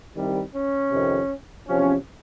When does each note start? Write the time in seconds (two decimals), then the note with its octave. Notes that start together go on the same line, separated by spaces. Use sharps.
0.15 C2 C3 D#3 G3
0.52 C#4
0.91 F2 C3 D#3
1.67 E2 C3 F3 C#4